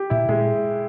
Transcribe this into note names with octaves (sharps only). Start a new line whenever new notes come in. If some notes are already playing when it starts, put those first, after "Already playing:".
Already playing: G4
A#2 E4
A#2 G#3